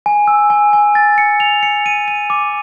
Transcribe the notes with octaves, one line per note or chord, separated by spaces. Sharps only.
G#5
E6
G#5
G#5
A6
C#7
F7
C#7
D#7
D#7
D6